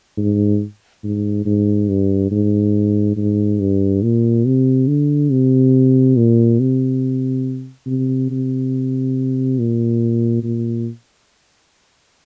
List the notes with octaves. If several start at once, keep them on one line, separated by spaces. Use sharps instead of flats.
G#2
G#2
G#2
G2
G#2
G#2
G2
A#2
C3
D3
C3
A#2
C3
C3
C3
A#2
A#2